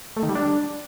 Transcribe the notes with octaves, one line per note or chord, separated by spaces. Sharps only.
A3
D#3
G3
D4